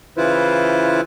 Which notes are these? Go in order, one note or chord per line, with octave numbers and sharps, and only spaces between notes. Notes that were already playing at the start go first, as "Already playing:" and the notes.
C#3 E3 E4 F4 B4 C5